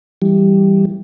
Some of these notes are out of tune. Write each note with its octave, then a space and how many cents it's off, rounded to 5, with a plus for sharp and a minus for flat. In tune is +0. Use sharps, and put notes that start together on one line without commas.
E3 +0 G3 +0